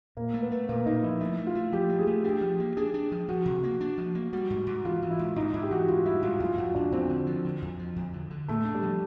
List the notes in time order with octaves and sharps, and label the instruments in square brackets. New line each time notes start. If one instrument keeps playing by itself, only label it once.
[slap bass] A#2 [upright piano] A#3
[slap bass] A3
[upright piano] B3
[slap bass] A3
[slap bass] A#2 [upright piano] A#3
[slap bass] A#2 [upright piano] D#4
[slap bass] F3 [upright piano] E4
[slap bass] A3 [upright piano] E4
[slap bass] A3
[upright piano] F4
[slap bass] A3
[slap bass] F3 [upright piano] G4
[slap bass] A3
[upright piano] G#4
[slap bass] A3
[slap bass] D4 [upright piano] G4
[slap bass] F3
A#3
[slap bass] D4 [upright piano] G#4
[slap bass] D4
F3
[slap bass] F3 [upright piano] F#4
[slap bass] C3
A#3
D4
F3
A#3
[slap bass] G3 [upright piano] F#4
[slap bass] G#2
G#2
[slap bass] E3 [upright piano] F4
[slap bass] E3
[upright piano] E4
[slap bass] G#2
[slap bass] G#2 [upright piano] D#4
[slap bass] G#2 [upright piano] E4
[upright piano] G4
[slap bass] E3 [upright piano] F#4
[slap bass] G#2 [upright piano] F4
[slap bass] G3 [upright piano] E4
[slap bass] G#2 [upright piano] F4
[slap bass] F2 [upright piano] F4
[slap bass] F2 [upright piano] F#4
[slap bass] F2 [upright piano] D4
[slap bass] F2 [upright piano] C4
[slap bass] D3
F3
D3
F2
F3
F2
D3
D3
[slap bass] A2 [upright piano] A3
[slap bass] D4
[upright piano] G3
[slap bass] F3